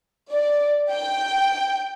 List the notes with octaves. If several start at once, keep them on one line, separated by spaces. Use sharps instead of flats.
D5
G5